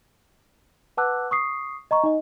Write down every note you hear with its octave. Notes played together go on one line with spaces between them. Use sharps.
B4 F#5 A5 D6 E6 F#6
C#6 D#6 C7
D#5 A#5 C#6
D#4 D#5